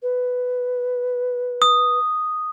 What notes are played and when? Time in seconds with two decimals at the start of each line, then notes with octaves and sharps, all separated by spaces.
0.03 B4
1.62 D#6